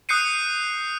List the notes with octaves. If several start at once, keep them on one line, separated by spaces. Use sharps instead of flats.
D#6 F#6 G6 C7 C#7 D#7